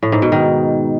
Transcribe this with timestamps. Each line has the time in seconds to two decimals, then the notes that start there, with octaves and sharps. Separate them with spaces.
0.03 A2
0.12 G#2
0.22 B2
0.32 D#3